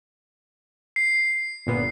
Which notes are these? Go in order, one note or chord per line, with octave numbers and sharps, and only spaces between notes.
C7
G1 A#2 B3